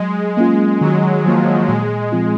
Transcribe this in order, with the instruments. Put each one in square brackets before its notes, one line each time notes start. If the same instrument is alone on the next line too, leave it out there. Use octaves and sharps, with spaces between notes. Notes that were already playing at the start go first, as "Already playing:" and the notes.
Already playing: [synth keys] F#3 [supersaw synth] G#3
[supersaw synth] G#3 [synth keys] A#3 C#4 F4
[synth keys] D#3 [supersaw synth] F#3
[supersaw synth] F3 [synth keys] F#3 A#3
[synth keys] A#2 [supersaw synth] G#3
[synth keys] F3 C4 F4